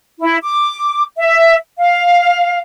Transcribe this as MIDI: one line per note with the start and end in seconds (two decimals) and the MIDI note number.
0.21 0.37 64
0.43 1.02 86
1.17 1.56 76
1.78 2.59 77